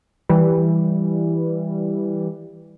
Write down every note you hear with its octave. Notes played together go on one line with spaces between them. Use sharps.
E3 G3